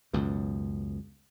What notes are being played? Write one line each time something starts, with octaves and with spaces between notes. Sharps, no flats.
C#2 F#2 B2